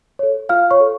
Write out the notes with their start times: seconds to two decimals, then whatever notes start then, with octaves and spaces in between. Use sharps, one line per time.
0.19 A4 C#5
0.49 F4 F5 F6
0.71 C#5 C#6
0.81 A4